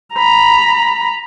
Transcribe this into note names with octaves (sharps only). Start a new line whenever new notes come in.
A#5 B5